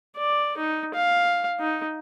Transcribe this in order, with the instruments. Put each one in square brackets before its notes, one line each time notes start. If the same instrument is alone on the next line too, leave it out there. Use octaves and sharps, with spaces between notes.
[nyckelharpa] D5
D#4
F5
D#4